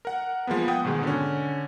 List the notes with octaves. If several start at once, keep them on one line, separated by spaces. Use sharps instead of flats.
A#4 F#5
F3 G#3 A#3 B3
F#5 G5 D#6
G#2 B2 D#3 G#3
D3 C#4